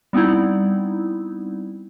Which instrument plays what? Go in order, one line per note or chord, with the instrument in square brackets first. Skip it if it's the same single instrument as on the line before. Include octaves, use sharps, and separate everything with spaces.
[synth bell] G3 B3 C4 D#4 E4